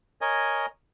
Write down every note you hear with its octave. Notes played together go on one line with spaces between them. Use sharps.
A#4 C#5 D#5 G#5